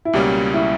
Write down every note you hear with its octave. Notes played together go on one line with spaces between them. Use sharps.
E4
C#2 B2 G3 A#3 C#4 G4
E4